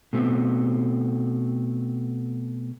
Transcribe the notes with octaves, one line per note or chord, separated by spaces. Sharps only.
B2 A3 C4